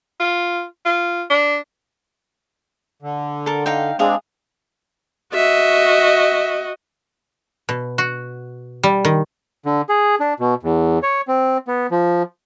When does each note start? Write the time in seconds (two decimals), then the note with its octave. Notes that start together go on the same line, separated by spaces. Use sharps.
0.20 F4
0.85 F4
1.30 D4
3.02 D3
3.46 A4 A#4
3.66 D#4 F5 G5
3.99 G#3 C4 D4 G#4 F5 D#6
5.34 F#4 D#5 E5
7.69 B2
7.98 F#4
8.83 G3
9.05 D#3
9.66 D3
9.89 G#4
10.20 D4
10.40 B2
10.63 E2
11.03 C#5
11.28 C4
11.67 B3
11.91 F3